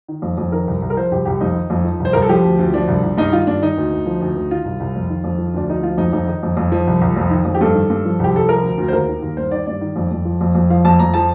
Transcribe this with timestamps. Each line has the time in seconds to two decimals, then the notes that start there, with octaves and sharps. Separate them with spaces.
0.08 D#3
0.22 F2
0.38 F2
0.52 D#3 A#4
0.67 C2
0.82 C2
0.90 A#4
0.97 F3 C5
1.11 C2 G4
1.25 C2 G4
1.41 F2 D#4
1.55 D#3
1.70 F2
1.84 F3
2.00 C2
2.05 C5
2.13 C2 A#4
2.22 A4
2.29 F3 G4
2.45 D2
2.59 D2
2.74 F3 D4
2.88 C2
3.03 C2
3.17 G2 D#4
3.32 D#3 F4
3.47 G2 D4
3.62 D#3 D#4
3.77 D2
3.92 D2
4.06 F3
4.21 D2
4.36 D2
4.51 D#3 F4
4.65 C2
4.80 C2
4.95 F2
5.09 D#3
5.24 F2
5.38 F3
5.54 D2 D4
5.69 D2 D#4
5.83 F3 F4
5.97 F2 D#4
6.13 F2 D#4
6.27 D#3 D#4
6.43 F2
6.57 F2
6.72 F3
6.87 C2
7.01 C2
7.17 F2
7.30 D#3
7.45 F2
7.55 G4
7.61 G2 A4
7.74 D#3
7.90 G2
8.05 F3
8.19 C2 G4
8.34 C2 A4
8.49 F3 A#4
8.63 D2
8.78 D2
8.88 C5
8.92 D#2 A#4
9.08 D#3
9.22 D#2
9.37 G2 C5
9.51 D#3 D5
9.66 G2 D5
9.81 D#3
9.96 F2
10.11 F2
10.25 F3
10.41 F2
10.55 F2
10.70 F3 F5
10.85 F2 A5
10.99 F2 A#5
11.14 F3 A5